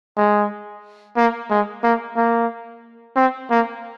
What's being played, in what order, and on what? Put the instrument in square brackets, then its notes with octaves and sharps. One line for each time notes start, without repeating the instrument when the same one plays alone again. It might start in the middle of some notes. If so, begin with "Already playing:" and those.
[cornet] G#3
A#3
G#3
A#3
A#3
C4
A#3